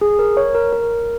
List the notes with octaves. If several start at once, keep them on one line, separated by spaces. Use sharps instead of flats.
G#4
A#4
C#5
A#4
A#4